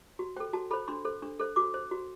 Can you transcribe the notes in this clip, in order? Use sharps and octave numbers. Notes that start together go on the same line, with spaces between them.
F#4
A4 C5 G5
F#4 A5
A4 C5 B5
D4 C6
A4 C5
D4
A4 C5
F#4 D6
C5
F#4